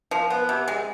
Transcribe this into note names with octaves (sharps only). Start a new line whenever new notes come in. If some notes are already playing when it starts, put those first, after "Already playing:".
F3
B3
C3
G#3